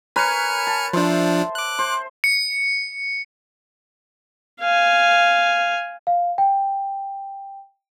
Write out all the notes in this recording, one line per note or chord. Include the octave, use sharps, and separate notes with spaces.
A#4 B4 C#5 G#5 F6 C#7
A5
F3 D4 C5 E5
D6 F#6
C5
C#7
F5 G#5
F5
G5